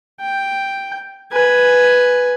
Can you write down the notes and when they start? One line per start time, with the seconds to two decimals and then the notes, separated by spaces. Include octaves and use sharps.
0.20 G5
1.32 B4 G#5